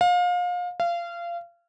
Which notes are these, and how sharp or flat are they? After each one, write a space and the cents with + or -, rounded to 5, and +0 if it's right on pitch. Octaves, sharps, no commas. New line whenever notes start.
F5 +30
F5 -25